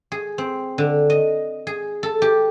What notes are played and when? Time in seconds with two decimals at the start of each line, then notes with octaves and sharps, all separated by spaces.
0.12 G#4
0.38 C4
0.78 D3
1.10 D#5
1.67 G#4
2.03 A4
2.22 G4